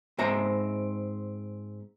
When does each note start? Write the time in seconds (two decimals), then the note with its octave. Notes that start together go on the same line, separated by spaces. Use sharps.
0.18 G#2 C4 E5 A#5